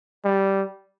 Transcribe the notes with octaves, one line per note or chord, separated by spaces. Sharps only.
G3